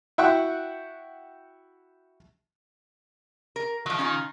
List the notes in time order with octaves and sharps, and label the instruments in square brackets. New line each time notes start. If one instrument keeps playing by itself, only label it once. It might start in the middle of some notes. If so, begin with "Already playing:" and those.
[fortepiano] E4 F#4 F#5 G5 C#6
[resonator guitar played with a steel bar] A#4
[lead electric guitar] D#3 [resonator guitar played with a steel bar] F3 F#3
[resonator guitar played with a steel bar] C#4 D#4 F4